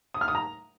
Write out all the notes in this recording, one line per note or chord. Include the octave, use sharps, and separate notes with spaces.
D#6
F6
D#6
A#5